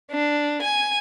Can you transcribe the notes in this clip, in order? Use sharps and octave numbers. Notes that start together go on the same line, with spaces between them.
D4
G#5